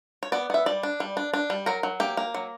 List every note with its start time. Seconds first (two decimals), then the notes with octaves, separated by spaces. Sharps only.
0.23 C#5
0.32 B3 D5
0.50 B3 E5
0.66 G3 D5
0.83 D4
1.00 G3
1.17 D4
1.34 D4
1.50 G3
1.66 F#3 A#4
1.83 F#3
2.00 A#3 G4
2.17 A#3
2.34 F#3